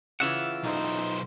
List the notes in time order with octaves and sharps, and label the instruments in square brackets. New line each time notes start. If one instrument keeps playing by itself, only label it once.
[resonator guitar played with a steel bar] C#3 E3 [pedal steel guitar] F4 E5 F#5
[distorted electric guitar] B1 C5 [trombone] D#4